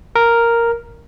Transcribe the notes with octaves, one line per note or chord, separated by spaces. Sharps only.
A#4